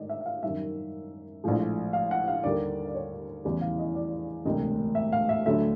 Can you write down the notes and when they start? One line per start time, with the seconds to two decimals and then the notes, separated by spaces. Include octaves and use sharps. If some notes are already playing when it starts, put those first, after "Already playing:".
Already playing: G#2 D#3 A3 D5 D#5
0.09 E5
0.21 E5
0.26 F5
0.42 F#2 D#3 G3 E5
1.44 A#1 A2 F3 G#3
1.93 F5
2.11 F#5
2.28 F5
2.44 D#2 D3 G3 A#3 D5
2.88 D5
2.95 C#5
3.44 F1 E2 C#3 E3 G3 D5
3.61 F5
3.78 D#5
3.95 D5
4.45 E1 D2 C3 D#5
4.95 E5
5.12 F5
5.29 E5
5.46 D2 D3 F#3 A3 E5